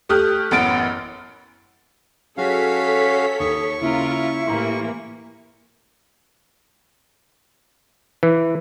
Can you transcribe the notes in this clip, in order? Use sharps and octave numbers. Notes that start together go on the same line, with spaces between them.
A3 G4 D#6 F6 F#6
A1 F#2 B3 A6 D7
F#3 C#4 F#4 G#4 A4 C#5 F5 B6
D#2 C#6 D#6
C#3 A#3 C#4 E4 F4 A#4
A2 E3 A#3 G4 A#5 C6
E3